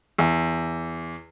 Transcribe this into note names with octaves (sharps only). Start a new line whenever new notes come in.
E2